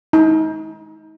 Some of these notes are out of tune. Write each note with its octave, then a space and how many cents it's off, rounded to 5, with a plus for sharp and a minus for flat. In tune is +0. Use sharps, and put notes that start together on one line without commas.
D#4 +35